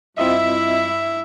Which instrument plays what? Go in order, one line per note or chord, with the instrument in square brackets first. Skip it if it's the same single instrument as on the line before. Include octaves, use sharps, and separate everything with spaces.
[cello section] G2 E4 [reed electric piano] C4 F4 D#5 [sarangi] E5